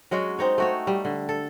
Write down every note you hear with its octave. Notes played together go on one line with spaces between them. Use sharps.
F#3 G#3 C#4 F#4
C4 D#4 C#5
A3 F#4 C#5
G3
D3
A4